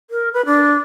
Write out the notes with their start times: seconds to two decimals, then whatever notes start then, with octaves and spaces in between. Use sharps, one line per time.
0.11 A#4
0.33 B4
0.46 D4